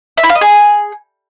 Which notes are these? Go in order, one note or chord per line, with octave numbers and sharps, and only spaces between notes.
E5
E4
F5
D#5
G#4